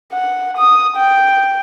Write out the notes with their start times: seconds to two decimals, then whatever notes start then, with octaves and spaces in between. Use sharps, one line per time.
0.12 F#5
0.57 D#6
0.97 G5